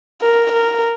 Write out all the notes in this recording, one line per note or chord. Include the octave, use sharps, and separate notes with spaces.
A#4
A#4